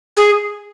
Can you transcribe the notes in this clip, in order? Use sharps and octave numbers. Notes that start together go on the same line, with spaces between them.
G#4